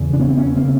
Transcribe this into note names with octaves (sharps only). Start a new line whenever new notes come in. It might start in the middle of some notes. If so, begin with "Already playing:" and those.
Already playing: E2 C#3
D4
B3 C#4
C4
B3 C#4
C#3 A#3 C4